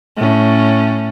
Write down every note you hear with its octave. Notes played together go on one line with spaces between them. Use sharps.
A2 C#4